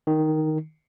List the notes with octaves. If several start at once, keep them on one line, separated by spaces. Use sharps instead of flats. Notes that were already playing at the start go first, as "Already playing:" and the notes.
D#3